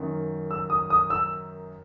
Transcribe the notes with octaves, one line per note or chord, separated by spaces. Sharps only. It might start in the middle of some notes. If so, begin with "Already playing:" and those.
Already playing: F#2 D#3
E6
D#6
D#6
E6